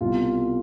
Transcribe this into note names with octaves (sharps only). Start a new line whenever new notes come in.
C2 B2 F4